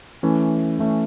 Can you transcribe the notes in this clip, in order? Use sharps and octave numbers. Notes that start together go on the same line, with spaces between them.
E3 A3 C#4
E3 A3 C#4